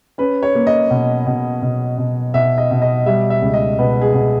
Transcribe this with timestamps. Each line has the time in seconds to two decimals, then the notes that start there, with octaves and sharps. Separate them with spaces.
0.18 C#4 B4
0.43 C#5
0.55 A#3
0.67 D#5
0.90 B2
1.26 B2
1.62 B2
1.98 B2
2.34 B2 E5
2.58 D#5
2.71 B2
2.82 D#5
3.06 G3 E5
3.30 E5
3.42 C#2
3.54 D#5
3.79 B2 B4
4.02 G#4
4.14 B2